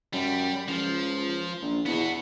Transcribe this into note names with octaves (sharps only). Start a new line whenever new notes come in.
F#2 G3
C#2 F3
A#1
E2 B3 F#4